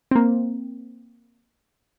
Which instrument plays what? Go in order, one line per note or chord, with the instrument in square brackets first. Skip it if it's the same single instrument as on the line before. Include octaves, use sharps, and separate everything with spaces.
[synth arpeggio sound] A#3 C4